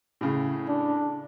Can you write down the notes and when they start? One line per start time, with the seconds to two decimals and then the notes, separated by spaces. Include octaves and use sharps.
0.21 A2 C#3
0.68 D4